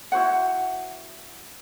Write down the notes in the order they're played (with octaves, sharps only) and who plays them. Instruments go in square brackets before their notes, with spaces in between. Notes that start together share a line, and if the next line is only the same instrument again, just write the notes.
[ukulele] E4 F#4 C5 F#5